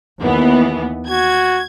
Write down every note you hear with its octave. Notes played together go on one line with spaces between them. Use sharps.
D#2 E3 B3
F#4 G#6